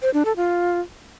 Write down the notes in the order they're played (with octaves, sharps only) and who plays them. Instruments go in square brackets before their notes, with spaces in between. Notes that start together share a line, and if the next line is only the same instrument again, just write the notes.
[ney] C5
D4
A4
F4